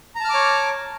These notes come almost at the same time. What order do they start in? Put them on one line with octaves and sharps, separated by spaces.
A#5 A5 F6 D6 C#5